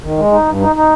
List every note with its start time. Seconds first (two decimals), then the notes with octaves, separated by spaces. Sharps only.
0.02 D#3
0.18 G#3
0.32 D#4
0.46 G2
0.61 D#4
0.76 D#4